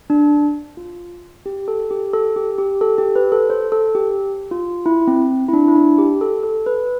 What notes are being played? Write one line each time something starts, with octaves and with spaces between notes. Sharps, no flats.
D4
F4
G4
A4
G4
A4
G4
G4
A4
G4
B4
A4
C5
A4
G4
F4
E4
C4
E4
D4
E4
D4
G4
A4
A4
B4